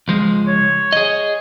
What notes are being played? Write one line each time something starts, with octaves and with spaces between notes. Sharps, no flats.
C#2 F3 G#3
C#5
G#4 D#5